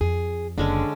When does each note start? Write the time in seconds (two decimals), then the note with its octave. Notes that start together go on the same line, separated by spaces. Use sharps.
0.01 F2 G#4
0.58 F#1 D3 G#3 C#4 D4